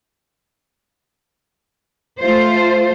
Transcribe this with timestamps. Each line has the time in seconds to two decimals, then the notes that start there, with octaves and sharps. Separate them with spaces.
2.19 A3 F4 C5